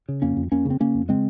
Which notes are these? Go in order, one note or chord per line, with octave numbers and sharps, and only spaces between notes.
C#3
F2 A#3 C#4
F2
F2 A#3 C#4
C#3
C4
C#3 A#3 C#4
F2
C#3 G#3 C4